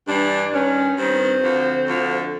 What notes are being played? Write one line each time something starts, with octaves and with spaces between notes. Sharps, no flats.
G2 E3 D4
G2 D#3 C#4
G2 D#3 C4
D2 D3 F3
D2 D3 F3